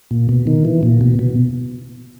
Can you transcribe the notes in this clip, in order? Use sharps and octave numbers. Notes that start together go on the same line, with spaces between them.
A#2
B2
D#3
E3
A#2
B2
B2